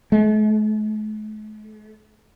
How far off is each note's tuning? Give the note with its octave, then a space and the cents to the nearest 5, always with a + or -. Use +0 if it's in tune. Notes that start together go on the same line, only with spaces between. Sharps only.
A3 -45